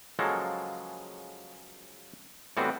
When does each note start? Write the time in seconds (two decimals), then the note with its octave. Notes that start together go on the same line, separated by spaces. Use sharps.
0.19 C#3 F3 F#3 G#3 A#3 A4
2.57 A2 E3 G3 B3 C4 F#4